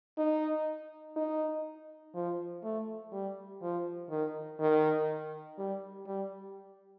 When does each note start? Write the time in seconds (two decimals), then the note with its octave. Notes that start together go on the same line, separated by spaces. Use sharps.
0.18 D#4
1.16 D#4
2.15 F3
2.64 A3
3.12 G3
3.62 F3
4.10 D#3
4.60 D#3
5.58 G3
6.07 G3